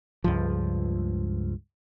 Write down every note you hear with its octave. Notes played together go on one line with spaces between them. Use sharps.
C#2 G2 F3